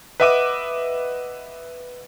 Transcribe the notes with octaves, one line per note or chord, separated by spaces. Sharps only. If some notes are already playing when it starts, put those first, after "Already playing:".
B4 D#5 E5 F#5 D6 D#7